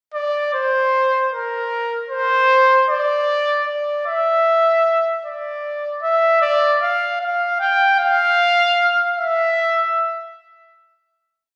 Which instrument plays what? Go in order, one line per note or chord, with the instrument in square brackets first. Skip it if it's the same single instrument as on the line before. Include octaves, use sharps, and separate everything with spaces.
[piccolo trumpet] D5
C5
A#4
C5
D5
D5
E5
D5
E5
D5
F5
F5
G5
F5
E5